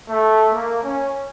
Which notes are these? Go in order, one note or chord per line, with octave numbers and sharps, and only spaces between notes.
A3
A#3
C#4